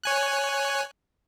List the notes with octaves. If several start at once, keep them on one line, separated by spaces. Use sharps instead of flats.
C#5 G#5 F#6